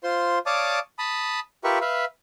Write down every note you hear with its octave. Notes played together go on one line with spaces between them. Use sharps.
F4 C5 C6
C#5 D5 F5 A5 D6 D#6
A5 B5 D#6
F4 G4 A#4 B4 E5 C#6
B4 E5 F5